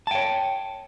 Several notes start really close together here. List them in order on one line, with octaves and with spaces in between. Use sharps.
A5 G5 C#5